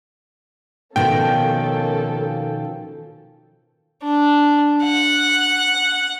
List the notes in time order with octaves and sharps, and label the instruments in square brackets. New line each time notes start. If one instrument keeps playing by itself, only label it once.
[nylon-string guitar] B2 D#3 F3 [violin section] A#3 C#4 A4 [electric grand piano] G5
[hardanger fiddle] D4
F#5